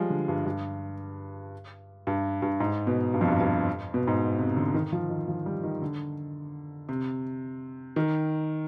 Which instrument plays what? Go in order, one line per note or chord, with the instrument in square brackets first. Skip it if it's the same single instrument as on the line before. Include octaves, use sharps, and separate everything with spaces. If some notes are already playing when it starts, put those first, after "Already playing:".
Already playing: [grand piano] F3 G3 G#3
D3
G2
G2
G2
G2
G#2
B2
G2
F2
G2
G2
B2
G#2
C3
D3
D#3
F3
D#3
F3
G3
D#3
D3
C3
D#3